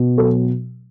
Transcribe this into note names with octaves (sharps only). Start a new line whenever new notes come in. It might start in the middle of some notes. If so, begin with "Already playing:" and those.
Already playing: B2
F#3 A4